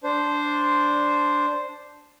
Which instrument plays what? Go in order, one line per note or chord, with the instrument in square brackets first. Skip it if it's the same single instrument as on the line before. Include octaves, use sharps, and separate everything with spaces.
[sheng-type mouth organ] D4 C5